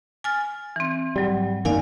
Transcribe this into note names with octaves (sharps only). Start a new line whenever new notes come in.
G#5 F6 A6
E3 C4
G#2 F#3 G3
F#2 D#3 A#3 D5 F5 G#5